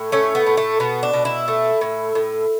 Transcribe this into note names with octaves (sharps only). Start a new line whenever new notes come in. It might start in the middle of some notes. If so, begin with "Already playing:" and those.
Already playing: A2
A3 C#4
B3
A2
A3
B2 B3
D4
B2
E4
A3
A2
A2